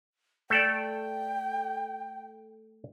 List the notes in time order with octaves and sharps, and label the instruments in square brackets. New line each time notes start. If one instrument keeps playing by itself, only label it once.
[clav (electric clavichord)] A3 A4 D5 [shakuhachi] G5